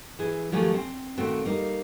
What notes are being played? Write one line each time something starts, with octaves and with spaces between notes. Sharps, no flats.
E3 G#4
D#3 F3 F#3 A3 G4 G#5
C4
A#2 D#3 A3 C4 F#4
G3 A#3 D#4